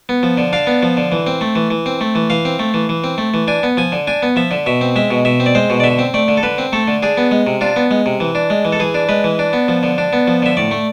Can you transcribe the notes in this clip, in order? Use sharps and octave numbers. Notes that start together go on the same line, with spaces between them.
B3
F3
D3
D4 F5
B3
F3
D3
E3
C4
A3
E3
E3
C4
A3
E3
E3 F5
C4
A3
E3
E3
C4
A3
E3
D4 G#5
B3
F3 G#5
D3
D4 G#5
B3
F3 E5
D3
B2 E5
C4
G#3 E5
B2
B2 E5
C4
D5
G#3 C5
B2
D5
D3 E5
C4
A3 D5
D3
A4
D3 B4
C4
A3 A4
D3
D4 G#4
B3
G#3
C3
D4 F4
B3
G#3
C3
E3
D4
G#3
E3
A4
E3 G#4
D4
G#3 B4
E3
D4
B3
F3
D3
D4
B3
F3
D3 E5
A2 D5
A3